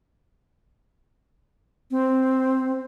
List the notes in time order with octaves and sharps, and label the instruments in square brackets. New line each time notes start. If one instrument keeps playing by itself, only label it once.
[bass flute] C4